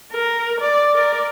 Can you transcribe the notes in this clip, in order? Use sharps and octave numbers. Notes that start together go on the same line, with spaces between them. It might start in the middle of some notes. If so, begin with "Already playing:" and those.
A#4
D5
A#4 D5